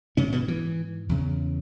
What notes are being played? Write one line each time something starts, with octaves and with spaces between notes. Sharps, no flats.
G#2 C#3 C#4
B2 B3
E3
E2 C#3